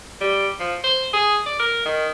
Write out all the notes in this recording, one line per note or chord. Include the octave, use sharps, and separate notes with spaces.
G3
F3
C5
G#4
D5
A#4
D#3